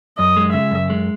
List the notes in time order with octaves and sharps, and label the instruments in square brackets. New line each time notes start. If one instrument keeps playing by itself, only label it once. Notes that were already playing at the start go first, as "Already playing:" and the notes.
[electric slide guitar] F#2 [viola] D#5
[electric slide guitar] G#3
[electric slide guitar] C#3 [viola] E5
[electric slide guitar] F#2
G#3